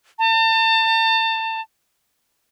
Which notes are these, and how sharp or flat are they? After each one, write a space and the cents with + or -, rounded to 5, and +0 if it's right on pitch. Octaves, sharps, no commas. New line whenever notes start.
A5 +35